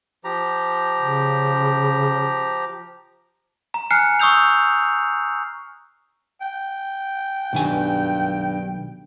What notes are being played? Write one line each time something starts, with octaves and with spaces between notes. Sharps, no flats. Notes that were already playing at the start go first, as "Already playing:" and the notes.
F3 G4 A#5
C#3
A#5
G#5 A#5 F6 F#6 C7 C#7
C#6 D#6 E6 G6 F7
G5
B1 G2 D#3 G#5